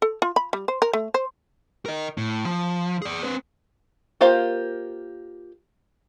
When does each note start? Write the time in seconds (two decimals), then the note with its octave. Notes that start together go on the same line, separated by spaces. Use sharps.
0.02 A4
0.22 F4
0.36 B5
0.53 G3
0.68 C5
0.82 A#4
0.93 A3
1.14 C5
1.86 A#4 D#5
2.18 A2
2.46 F3
3.02 G#4 D5
3.23 C4 B4
4.21 A#3 F4 G4 C5 F5